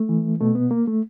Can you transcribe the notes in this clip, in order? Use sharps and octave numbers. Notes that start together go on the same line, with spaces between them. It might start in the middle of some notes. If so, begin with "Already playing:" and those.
Already playing: A3
E3
B2 A3
B3
A#3
A3